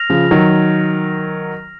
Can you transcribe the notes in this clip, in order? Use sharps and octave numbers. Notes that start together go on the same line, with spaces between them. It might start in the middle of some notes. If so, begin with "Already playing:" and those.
Already playing: F6 A#6 F7
C#3 F3
D#3 F#3